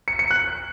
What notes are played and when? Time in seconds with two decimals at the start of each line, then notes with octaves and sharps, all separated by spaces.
0.08 C#7
0.19 C#7
0.31 F#6